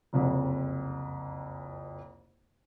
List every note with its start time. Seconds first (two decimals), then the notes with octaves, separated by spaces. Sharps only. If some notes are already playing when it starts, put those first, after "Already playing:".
0.13 F#1 C2 F2